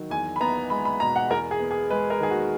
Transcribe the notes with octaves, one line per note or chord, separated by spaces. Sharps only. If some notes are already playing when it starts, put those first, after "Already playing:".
Already playing: D#3 F#3
E2 G#5
B5
B3 A#5
G#3 B5
B5
B2 A#5
F#5
E2 A#4
G#4
B3
G#4
G#3 B4
A#4
D#3 G#4
F#4